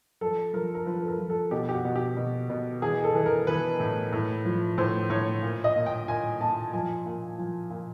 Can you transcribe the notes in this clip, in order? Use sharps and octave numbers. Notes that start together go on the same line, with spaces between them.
F3 A4
F3 A#4
A#4
F3 B4
A4
A#4
F3
A4
B2 G4
G4
F#4
B2
G4
B2
B2
E3 G#4
A4
E3
A#4
E3 B4
A2
A2
F3
A2 C5
A2 C#5
A#2
D#5
A#2
G5
A#2 G#5
A#2 A5
F3 G#5
A#2
F3
A#2